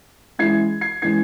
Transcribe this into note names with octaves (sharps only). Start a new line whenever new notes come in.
E3 G#3 C#4 E4 G#6 C7
G#6 C7
E3 G#3 C#4 E4 G#6 C7